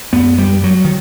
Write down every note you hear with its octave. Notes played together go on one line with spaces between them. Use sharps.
F#2 B3
G3
F#3
D#3